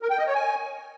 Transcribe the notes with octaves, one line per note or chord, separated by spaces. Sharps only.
A#4
G5
D#5
C#5
G#5